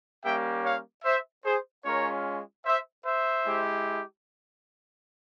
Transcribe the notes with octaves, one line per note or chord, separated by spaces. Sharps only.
G3 A#3 C#4 G4 E5 G5
C#5 F5
C5 E5
G#4 C5
G#3 C#4 F4 A#4 C#5
C5 E5
C5 E5
G#3 E4 G4